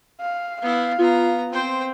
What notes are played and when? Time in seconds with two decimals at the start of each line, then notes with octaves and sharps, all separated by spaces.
0.21 F5
0.62 B3 E4 F5
0.98 B3 F4 A#5
1.52 C4 C5 G5